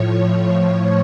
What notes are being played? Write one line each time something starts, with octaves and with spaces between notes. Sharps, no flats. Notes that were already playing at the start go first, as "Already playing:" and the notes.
Already playing: A2 F3 C#5